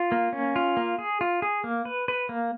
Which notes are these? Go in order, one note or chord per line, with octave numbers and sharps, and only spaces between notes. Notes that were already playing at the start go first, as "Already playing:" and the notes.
Already playing: F4
A#3
C#4
F4
A#3
G#4
F4
G#4
A#3
B4
B4
A#3